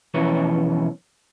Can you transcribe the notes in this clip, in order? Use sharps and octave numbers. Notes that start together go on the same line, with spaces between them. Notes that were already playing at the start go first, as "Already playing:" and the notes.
B1 F2 E3 C#4 C#5